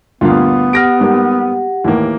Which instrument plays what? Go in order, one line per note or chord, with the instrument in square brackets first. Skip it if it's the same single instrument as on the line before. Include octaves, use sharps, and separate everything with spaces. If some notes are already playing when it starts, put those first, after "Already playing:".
[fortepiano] D2 G2 A#2 [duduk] B3 [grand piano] F4 F5
[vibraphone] G4 F#5 [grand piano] F6 A#6 D7
[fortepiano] G#2 G3 A#3
[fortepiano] D#2 A2 [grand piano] E3 A#3